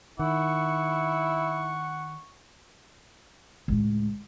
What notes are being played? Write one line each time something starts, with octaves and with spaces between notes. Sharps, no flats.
D#3 E4 F#5 C#6
C#2 A2